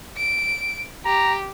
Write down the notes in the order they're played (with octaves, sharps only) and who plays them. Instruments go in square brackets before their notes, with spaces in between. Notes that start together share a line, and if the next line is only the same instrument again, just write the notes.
[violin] D7
[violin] G4 [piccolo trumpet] A#5